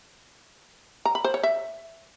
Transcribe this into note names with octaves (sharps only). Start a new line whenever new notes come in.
A#5
B5
C5
C#5
E5